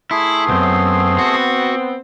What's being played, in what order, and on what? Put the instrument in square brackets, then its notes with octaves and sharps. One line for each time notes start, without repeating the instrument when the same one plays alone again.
[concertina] A3 G#4 C6 [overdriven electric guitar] E4
[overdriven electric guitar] C2 F#2 [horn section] B3 C4
[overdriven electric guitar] F#4